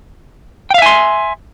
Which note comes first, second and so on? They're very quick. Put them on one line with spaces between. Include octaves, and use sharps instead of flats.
G5 F5 E5 G#5 C6